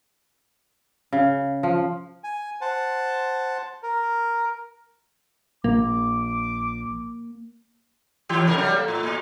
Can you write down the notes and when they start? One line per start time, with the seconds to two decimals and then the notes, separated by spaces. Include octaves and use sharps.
1.13 C#3
1.63 F3
2.24 G#5
2.61 C5 F#5 A5
3.83 A#4
5.64 A#1 A#3 D6
8.29 A2 E3 G4
8.45 A2 C3 A#4
8.58 F#3 G3 A3
8.73 A#3
8.88 A2
9.03 A#2